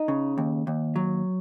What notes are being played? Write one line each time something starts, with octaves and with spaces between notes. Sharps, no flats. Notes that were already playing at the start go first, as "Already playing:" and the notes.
Already playing: D#4
C#3
D#2
D#2
F#3